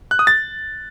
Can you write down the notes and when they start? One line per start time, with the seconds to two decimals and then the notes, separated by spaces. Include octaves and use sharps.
0.11 F#6
0.19 D#6
0.27 A6